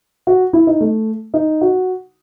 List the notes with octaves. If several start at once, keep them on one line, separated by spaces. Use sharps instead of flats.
F#4
E4
D#4
A3
D#4
F#4